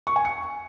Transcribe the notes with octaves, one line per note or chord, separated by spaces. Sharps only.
C#6
G#5
C#7